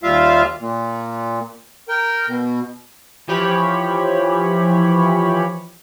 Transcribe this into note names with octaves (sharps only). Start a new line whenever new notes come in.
D#2 G3 F4 E5 F5
A#2
A#4 G5
B2
E3 F3 G4 C#5 B5